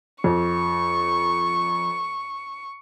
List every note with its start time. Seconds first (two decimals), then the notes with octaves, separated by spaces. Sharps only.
0.24 F2 C#6